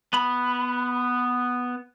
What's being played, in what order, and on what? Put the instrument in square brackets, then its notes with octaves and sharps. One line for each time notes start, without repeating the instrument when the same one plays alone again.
[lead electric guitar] B3 B5